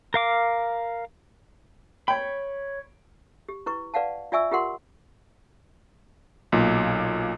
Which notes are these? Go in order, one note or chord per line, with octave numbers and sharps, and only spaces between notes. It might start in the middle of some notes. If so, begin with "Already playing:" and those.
A#4 F5 D6
C#5 G5 B5
G4
E4 B4 C#6
B4 D5 F5 F#5 A5
F4 D5 E5 G#5 C#6 E6
F4 G4 A#4 F#5 C6
B1 A#2